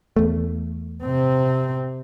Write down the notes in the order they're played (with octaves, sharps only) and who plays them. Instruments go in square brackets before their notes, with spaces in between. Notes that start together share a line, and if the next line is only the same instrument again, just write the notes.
[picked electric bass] E2 A3
[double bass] C3 C4